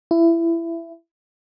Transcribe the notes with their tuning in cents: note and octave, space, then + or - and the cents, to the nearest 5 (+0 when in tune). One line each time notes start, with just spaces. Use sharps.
E4 +20